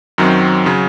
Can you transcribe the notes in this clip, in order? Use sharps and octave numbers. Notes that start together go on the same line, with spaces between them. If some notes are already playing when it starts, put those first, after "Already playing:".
F#2 D#3 F#3 C4
C#3 F#3